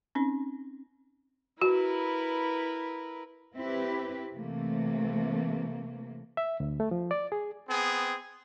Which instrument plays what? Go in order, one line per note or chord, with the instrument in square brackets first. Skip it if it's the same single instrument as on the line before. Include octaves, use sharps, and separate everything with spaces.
[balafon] C4 C#4 D#4
[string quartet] E4 A#4 B4 [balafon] F#4
[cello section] C4 E4 G4 B4
C3 E3 A3 A#3
[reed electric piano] E5
D2
A3
F3
D5
G#4
[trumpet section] B3 C4 G#4